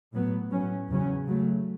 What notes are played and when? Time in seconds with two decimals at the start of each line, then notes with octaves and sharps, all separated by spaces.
0.13 A2 F#3 B3
0.51 A2 F#3 C#4
0.88 E2 C#3 F#3 C#4
1.27 C#3 F#3 A3